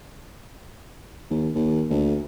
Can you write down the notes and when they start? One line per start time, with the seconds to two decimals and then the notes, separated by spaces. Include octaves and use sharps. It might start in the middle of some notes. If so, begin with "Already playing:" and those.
1.31 D#2
1.55 D#2
1.90 D2